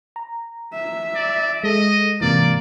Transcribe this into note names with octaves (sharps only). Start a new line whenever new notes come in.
A#5
E5
D5
G#3 A4 D#5
G#2 C3 E3 A#3 D5